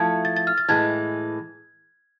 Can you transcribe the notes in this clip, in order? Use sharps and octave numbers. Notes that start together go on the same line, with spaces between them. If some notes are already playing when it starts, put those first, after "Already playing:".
Already playing: F3 A3 E4 A4 G#6
A6
A6
F6
A6
A2 E3 G#3 G#6